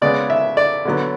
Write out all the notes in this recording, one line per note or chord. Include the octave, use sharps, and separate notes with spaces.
C#3 G#3 B3 D5
E5
D5
D3 F#3 B3